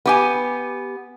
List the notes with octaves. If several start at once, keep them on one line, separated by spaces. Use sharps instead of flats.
B3 G4 G#5